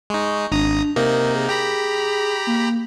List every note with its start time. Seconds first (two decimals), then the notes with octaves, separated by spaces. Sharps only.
0.10 G#3 D#4 C#6
0.52 G#1 D4 A#5 D#6
0.96 C3 A#3 D#4 A#4
1.35 G#4
1.49 G4 A#5 B5
2.47 A#3